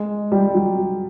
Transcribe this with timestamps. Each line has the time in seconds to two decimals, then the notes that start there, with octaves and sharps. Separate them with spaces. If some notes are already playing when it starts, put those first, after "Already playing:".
Already playing: G#3
0.32 G3
0.55 F#3